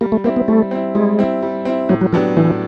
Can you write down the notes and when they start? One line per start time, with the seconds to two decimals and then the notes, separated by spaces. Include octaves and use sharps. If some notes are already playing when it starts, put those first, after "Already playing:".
0.01 G3 A#3
0.12 A3
0.24 A#3 C4 E4
0.36 B3
0.48 G3 A3
0.71 C4 E4
0.95 G3 G#3
1.19 C4 E4
1.43 G3
1.65 C4 E4
1.89 A2 F#3
2.01 F#3
2.13 F3 F#3 B3 D4 G4
2.37 A2 E3